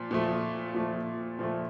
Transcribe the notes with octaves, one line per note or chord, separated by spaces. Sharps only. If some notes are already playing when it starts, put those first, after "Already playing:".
Already playing: A#2 F3
A#2 F3 A3
A#2 F3 A3
A#2 F3 A3